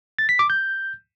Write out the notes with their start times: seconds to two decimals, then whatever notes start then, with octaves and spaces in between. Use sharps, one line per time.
0.19 A6
0.29 B6
0.39 D6
0.50 G6